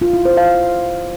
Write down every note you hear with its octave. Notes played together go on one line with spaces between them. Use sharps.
F4
E4
C5
F5